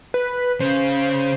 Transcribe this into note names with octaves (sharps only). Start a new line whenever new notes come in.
B4
C#3 C5